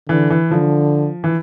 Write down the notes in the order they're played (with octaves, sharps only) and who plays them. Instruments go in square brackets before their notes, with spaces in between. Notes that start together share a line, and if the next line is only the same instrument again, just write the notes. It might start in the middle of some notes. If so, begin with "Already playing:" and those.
[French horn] D3 [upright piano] E3
[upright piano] E3
[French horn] D3 [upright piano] F3
[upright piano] E3